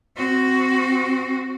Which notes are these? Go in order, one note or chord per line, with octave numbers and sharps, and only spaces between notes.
C4 F#4